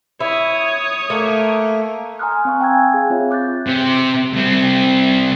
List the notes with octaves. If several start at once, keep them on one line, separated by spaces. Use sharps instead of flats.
E4 C#5 D#6
A3 A#3
G#5 A#5 C6 D#6 F6 F#6
C4 F5 C#6
G5 G#5 E6 G#6
G#4 F5
C4 F4 C#5 E5
D6 F#6 G6 A6
C3
C2 C4